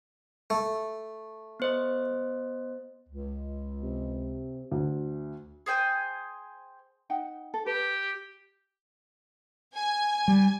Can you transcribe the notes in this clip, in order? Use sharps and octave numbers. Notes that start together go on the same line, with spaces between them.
A3
B3 C5 D#5
C#2
C3
D2
G#4 C5 G5 G#5
D#4 F#5 G5
A4
G4 B4
G#5
G3